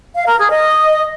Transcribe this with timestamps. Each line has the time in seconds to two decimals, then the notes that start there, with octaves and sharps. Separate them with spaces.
0.15 F5
0.27 A#4
0.39 G#4
0.50 D#5